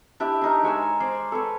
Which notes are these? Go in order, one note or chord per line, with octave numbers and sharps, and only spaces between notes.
D4 E4 G4 E5
D4 D#4 A#4
G#3 C#5 G#5 E6
C5 D5 C6
A4 B4 C#5